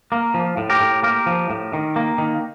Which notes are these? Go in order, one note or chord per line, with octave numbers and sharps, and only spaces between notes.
A#3
F3
A2
G4 A#4
A2
A#3 G4 A#4
F3
A2
D#3
A#3
D#3